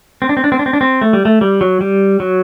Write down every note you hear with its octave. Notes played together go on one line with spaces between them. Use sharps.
C4
D4
C4
D4
C4
D4
C4
D4
C4
A3
G3
A3
G3
F#3
G3
F#3